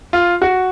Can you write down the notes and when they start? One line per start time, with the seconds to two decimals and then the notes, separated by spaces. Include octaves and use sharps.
0.13 F4
0.42 F#4